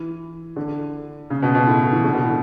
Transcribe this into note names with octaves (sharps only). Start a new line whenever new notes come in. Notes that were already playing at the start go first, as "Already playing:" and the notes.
Already playing: E3
D3
C#3
B2
B2
A2
E3
D3
B2
A2